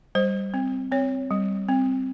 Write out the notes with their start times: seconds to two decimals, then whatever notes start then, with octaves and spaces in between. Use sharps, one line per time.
0.15 G3 C5
0.54 C4
0.92 C4 C#5
1.31 G3
1.69 C4